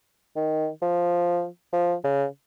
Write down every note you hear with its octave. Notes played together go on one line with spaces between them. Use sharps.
D#3
F3
F3
C#3